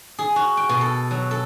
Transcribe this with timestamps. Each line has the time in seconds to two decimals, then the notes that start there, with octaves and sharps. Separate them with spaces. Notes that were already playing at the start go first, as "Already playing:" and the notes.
0.19 G#4
0.36 F#4
0.57 G5
0.69 B2
0.81 A4
1.11 F#3
1.31 A4